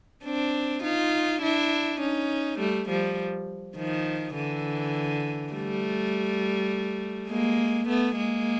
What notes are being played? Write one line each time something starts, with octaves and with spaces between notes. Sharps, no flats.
C4 D4
D#4 F4
D4 E4
C#4 D#4
G3 A3
F3 G3
D#3 F3
D3 E3
G3 A3
G#3 A#3
A3 B3
G#3 A#3